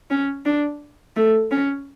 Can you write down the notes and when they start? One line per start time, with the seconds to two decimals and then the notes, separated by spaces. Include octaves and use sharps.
0.10 C#4
0.46 D4
1.16 A3
1.51 C#4